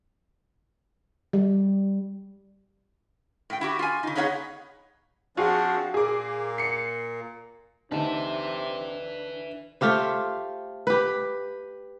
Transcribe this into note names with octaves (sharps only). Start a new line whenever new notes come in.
G3
A2 G5
E4 F#4 G4
F4 G#5
C#3 D#4
B3 D#4 G#4 C#5 F5 F#5
F3 C4 D4 F4 F#4 G#4
A#2 A#3 G#4 D6
C7 C#7
D2 C3 D4 D#4 B4 E5 A5
A3 F4 G4 C5
G4 B4